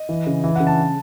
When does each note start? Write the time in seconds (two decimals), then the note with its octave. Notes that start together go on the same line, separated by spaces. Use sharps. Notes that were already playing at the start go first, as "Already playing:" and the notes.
Already playing: D#5
0.09 E3
0.27 C#3
0.44 E3
0.56 C#3 F#5
0.67 A5